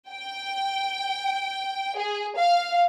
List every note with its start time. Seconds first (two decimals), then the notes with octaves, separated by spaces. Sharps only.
0.11 G5
1.97 G#4
2.37 F5